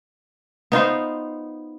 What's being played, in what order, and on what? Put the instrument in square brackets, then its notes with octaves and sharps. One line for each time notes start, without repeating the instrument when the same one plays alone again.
[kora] B3 D#4 F4 C5